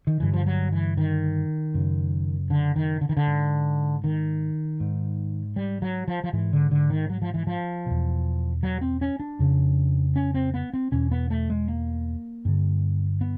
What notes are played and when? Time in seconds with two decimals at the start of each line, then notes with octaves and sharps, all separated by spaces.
0.07 D#3
0.20 G2 D3 E3
0.33 F3
0.46 F#3
0.72 E3
0.97 D#3
1.74 F#2 C#3
2.50 D3
2.76 D#3
3.01 D3
3.09 D#3
3.17 D3
3.27 G#2
4.04 D#3
4.80 G#2
5.56 G3
5.82 F#3
6.08 F3
6.24 F3
6.33 G#2 E3
6.53 D3
6.71 D3
6.90 D#3
7.10 F#3
7.22 F3
7.34 E3
7.47 F3
7.86 E2 B2
8.63 F#3
8.81 C4
9.01 C#4
9.20 D4
9.39 F2 C#3
10.16 C#4
10.34 C4
10.54 B3
10.73 C4
10.92 E2 B2 C#4
11.11 B3
11.30 A3
11.50 G#3
11.68 A#3
12.45 G2 D3
13.21 B3